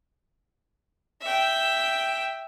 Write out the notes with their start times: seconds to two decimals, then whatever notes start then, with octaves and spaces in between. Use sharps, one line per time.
1.22 E5 G5